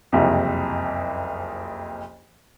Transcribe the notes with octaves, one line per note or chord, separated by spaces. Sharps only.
F#1 C2 F2